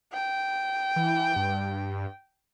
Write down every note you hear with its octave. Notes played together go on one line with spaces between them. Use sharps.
G5
E3
G2